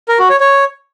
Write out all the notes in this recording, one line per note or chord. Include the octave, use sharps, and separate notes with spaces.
A#4
F#4
C#5
C#5